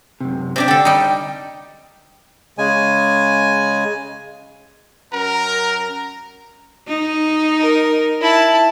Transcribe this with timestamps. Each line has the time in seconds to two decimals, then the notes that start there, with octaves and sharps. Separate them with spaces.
0.21 F#2 C3
0.56 C3 D4 G4
0.68 D3 A4 G5
0.85 G3 D#4
2.58 C#3 G#3 G#5
5.13 F#2 A#4 F#5 A#5
6.88 D#4
7.59 A#4
8.21 E4 A5